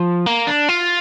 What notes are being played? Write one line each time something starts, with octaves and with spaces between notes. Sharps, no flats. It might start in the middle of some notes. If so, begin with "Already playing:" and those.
Already playing: F3
A#3
D4
F4